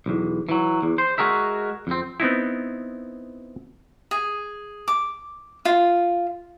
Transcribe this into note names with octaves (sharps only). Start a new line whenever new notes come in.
B1 E2
E3 F#3
E2
C5
G#3 F#4 G#4 A#4 E5
F2 C4
B3 C4 D#4 E4
G#4
D6
F4